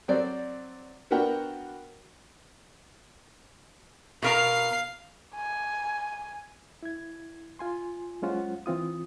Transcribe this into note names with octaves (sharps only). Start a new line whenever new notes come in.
F#3 C4 C5 D5
B3 D4 F#4 A#4 F#5 G5
B2 A#4 F5 A#5 C7
G#5
E4 G#6
F4 G#5 C6
F#3 G#3 C#4 F4 C5 F#5
E3 C4 F4 D#6